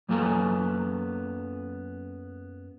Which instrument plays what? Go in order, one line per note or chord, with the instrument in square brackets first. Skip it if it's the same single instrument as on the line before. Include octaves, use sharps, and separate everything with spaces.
[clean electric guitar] F#2 F#3 A#3 B3 A4 G#5